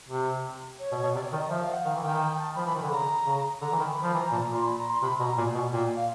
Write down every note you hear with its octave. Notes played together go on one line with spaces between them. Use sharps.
C3
C#5
B2
C#5
B2
C3 D5
D5
D#3
D#5
F3 E5
F5
F#5
D#3 F5
E3
D#3 G5
G5
A5
F3 B5
E3 B5
D#3
B5
D3
C#3 A#5
C#3
D3 A#5
E3
D#3 B5
B5
F3
E3 A#5
A#2 A5
A#5
A#2
C6
B5
A#5
C6
C3 B5
B2 A#5
A#2 G#5
B2 G#5
A#2 G5
F5